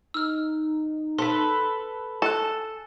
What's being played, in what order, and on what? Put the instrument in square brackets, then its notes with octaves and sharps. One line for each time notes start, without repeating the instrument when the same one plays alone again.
[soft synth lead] D#4 [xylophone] E6 F6
[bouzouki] A4 B4 [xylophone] C6
[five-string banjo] A4 [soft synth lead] G#5 [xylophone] A5 F#6